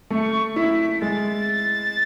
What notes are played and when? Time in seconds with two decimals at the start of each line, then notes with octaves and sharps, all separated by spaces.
0.10 A3 C#6
0.56 E4 B6
1.01 G#3 A6